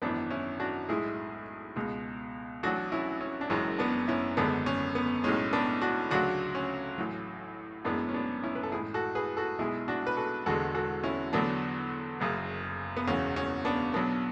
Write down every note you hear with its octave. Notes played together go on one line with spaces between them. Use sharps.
G#1 F#2 E3 B3 D4
C#4 E4
D4 F#4
B1 A2 G#3 E4 G#4
C#2 B2 G#3
A1 A2 F#3 D4 F#4
C#4 E4
C#4
D4
F#1 F#2 E3 G#3 C#4
B3 D4
C#4 E4
G#1 F#2 D3 G#3 B3 D4
C#4
B3
B1 A2 G#3 C#4
B3 D4
D4 F#4
D2 C#3 F#3 D4 F#4
C#4
A1 A2 F#3
F#1 F#2 E3 G#3 B3 D4
C#4
B3 D4
C#4 E4
B4
A4
A1 A2 G#3 E4 G#4
F#4 A4
G#4 B4
F#4 A4
B1 B2 G#3 E4 G#4
D4 F#4
B4
F#4 A4
E1 E2 D3 G#3 F#4 A4
F#4 A4
C#4 E4
E2 D3 F#3 B3 D4
F#1 F#2 C#3
B3
E1 E2 C#3 C#4
C#4
B3 D4
B1 B2 F#3 B3 D4